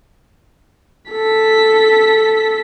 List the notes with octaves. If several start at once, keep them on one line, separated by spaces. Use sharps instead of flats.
A4 B6